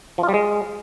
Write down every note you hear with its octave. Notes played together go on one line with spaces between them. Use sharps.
F3
F4
G3
G#3